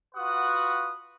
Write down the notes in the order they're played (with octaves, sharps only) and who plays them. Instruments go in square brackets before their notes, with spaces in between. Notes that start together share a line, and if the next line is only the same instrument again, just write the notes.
[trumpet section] F4 F#4 B4 F#5 D#6